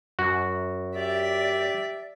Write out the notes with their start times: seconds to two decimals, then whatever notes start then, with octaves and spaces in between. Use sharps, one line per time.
0.19 F#2 F#4
0.94 G4 D5 E5